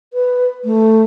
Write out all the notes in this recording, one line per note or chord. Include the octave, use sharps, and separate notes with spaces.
B4
A3